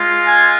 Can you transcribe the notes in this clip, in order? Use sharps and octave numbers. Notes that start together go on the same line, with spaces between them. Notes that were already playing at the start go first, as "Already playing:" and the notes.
Already playing: G#3 F4
G#5